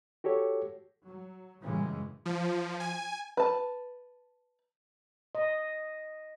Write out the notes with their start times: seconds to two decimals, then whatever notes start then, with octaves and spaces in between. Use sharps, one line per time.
0.24 F#4 G4 A4 C#5
1.04 F#3
1.62 F#2 A#2 C#3 E3 G3 G#3
2.25 F3
2.80 G#5
3.37 B4 A5
5.35 D#5